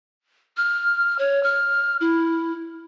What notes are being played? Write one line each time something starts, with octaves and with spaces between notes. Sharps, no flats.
F6
C#5
F6
E4